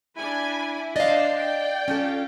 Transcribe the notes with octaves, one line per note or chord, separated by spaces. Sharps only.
D4 E4 G#5 B5
D4 C5 D5 D#5 F5
G5
C#4 F4 A4